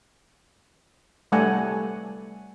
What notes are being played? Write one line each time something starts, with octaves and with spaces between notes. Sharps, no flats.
G3 A3 D5 F#5 G#5 A5